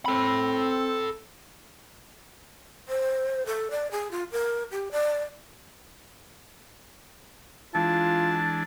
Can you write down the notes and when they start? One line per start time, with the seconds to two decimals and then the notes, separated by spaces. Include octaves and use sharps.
0.06 C4 A4 B5
2.88 C5
3.46 A4
3.71 D5
3.91 G#4
4.11 F4
4.32 A#4
4.71 G4
4.92 D5
7.75 E3 G#3 D4 F4 A5